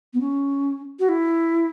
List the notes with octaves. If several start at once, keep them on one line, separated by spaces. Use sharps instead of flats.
B3
C#4
F#4
E4